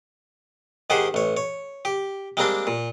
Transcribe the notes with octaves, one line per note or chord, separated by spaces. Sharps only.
G#2 D#3 G4 G#4 C5 F#5
A1 C#5
C#5
G4
G3 G#3 A#3 C4 D4
A#2